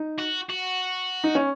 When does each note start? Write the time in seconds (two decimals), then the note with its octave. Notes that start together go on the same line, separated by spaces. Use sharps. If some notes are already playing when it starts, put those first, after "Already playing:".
Already playing: D#4
0.18 F#4
0.49 F#4
1.24 D#4
1.35 C#4